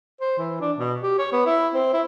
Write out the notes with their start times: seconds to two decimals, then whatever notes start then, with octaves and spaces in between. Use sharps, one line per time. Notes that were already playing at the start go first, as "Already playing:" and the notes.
0.20 C5
0.38 E3
0.61 D4
0.78 B2
1.02 G4
1.19 C#5
1.32 B3
1.46 E4
1.74 C4
1.93 E4